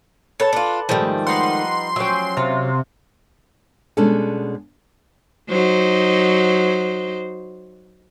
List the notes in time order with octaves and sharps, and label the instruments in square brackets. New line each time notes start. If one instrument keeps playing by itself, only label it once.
[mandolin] A4 B4 A5 [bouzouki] C#5
[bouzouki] D4 F4
[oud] G#2 D#3 A3 [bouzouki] F3 G3
[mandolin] D#4 B4 F#5 [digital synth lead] C6
[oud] F#3 C#4 [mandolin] E5 G5
[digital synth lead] C3 [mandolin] F4
[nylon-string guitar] B2 G3 G#3 C#4 D4 A4
[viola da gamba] F#3 D#4 C5